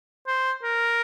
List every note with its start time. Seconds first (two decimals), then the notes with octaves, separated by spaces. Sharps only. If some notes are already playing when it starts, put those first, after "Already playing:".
0.27 C5
0.63 A#4